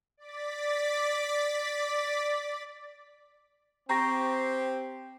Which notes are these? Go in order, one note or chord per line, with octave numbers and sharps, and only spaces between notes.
D5 D6 A6 B6
C4 G4 A#5 C#6 A#6